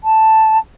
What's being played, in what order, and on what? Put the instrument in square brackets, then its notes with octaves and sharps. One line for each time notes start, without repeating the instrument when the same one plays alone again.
[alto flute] A5